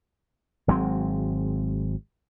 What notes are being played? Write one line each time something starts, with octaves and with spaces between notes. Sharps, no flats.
G#1 F#3 G#3 C4